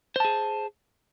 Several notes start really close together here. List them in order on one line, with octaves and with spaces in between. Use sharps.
C5 A5 G#4